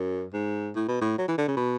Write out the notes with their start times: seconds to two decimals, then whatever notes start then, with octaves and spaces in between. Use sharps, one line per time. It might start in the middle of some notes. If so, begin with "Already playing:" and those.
Already playing: F#2
0.34 G#2
0.76 A2
0.88 B2
1.01 A2
1.18 F#3
1.28 E3
1.38 D3
1.48 C#3
1.57 B2